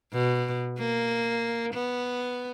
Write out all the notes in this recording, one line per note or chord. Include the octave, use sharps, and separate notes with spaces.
B2
A#3
B3